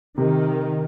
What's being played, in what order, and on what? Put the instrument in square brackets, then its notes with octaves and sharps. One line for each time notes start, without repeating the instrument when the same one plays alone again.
[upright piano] C3 [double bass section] D#3